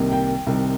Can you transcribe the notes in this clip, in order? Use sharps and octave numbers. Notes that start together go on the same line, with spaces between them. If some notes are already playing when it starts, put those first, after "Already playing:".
Already playing: C2 C3 D#3 A#3
G5
C2 C3 D#3 C4